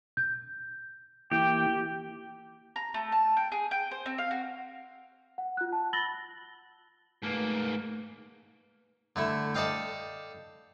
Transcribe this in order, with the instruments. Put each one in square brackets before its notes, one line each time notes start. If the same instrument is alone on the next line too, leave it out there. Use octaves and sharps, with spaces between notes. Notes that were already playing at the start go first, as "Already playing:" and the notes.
[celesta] G6
[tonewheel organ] E3 A#3 E4 [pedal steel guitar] G4 [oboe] G5
[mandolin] A#5
A3
A5
G5
G#4
G5
C5
C4
F5
F#4
[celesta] F#5
F4 F#6
A5
B5 E6 A6 A#6 F#7 G7
[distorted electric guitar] G#2 A#3 [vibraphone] A3 B4
[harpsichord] D3 A3 E4
A4 D5 D#5 F5 G5